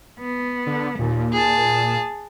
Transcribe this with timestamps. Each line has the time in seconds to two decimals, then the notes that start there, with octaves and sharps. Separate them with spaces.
0.19 B3
0.67 D3
0.99 D#2 A#2
1.32 G#4 A5